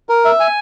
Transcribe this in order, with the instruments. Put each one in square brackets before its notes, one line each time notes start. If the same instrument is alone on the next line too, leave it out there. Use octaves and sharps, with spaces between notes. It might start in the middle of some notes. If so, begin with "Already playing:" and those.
[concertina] A#4
E5
G#5